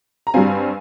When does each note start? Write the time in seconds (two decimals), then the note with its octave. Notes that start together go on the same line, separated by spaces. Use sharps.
0.27 A#5
0.34 G2 G3 C4 F5 G#5